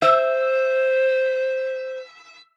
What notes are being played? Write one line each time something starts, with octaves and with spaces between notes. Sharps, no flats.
C5 E5